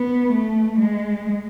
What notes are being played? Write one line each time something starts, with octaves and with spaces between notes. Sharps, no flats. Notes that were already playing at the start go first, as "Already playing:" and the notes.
Already playing: B3
A3
G#3